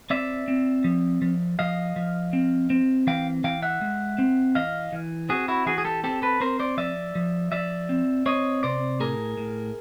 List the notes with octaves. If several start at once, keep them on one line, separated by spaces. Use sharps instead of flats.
C4 D5 E5
C4
F3
F3
F3 D#5 F5
F3
C4
C4
E3 F5 G5
E3 F5 G5
E5 F#5
G#3
C4
E3 D#5 F5
E3
C4 F#4 G#4
E4 F#4
E3 F#4 G#4
G#4
G4 A4
C4 G4 A4
A4 B4
C4 A#4 C5
C5 D5
F3 D5 E5
F3
F3 D5 E5
C4
C4 C#5 D#5
C3 C5 D5
A2 G#4 A#4
A2